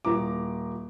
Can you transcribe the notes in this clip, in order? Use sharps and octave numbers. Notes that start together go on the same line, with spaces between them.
D#1 A#5 D6